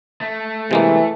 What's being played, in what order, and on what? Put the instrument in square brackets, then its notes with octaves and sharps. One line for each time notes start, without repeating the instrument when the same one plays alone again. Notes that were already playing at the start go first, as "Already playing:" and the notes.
[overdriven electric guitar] A3
[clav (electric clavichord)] C3 G#3 A#3 [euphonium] E3